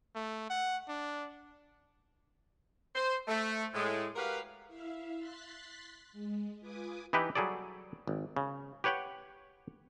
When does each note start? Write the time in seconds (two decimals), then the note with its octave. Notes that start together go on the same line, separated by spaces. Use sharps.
0.16 A3
0.50 F#5
0.89 D4
2.95 C5 C6
3.28 A3
3.74 A2 G#3
4.16 F#4 G4 A#4 B4 F5
4.68 E4 E5 F5
5.17 C6 F#6 A6 B6 C7
6.13 G#3
6.60 F4 B4 G#5 D6 D#6
7.13 E3 D#4 E4 G4 B4
7.35 F#3 G3 G#4 A4 D5
8.07 G#1
8.36 C#3
8.84 G4 B4 C#5 F#5 G5